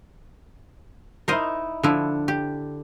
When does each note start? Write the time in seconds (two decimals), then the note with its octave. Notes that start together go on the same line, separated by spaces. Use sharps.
1.28 D#4 E4 A#4 C5 D#5
1.83 D3 F3 E4
2.28 G4